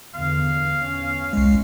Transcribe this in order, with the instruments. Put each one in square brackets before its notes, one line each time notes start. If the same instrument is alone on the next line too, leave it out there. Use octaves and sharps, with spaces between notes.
[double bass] E2 D3 [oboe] F5
[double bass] E2 C#4
[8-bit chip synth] C2 G#3